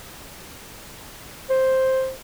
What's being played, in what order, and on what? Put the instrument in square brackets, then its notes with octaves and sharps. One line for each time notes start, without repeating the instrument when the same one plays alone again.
[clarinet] C5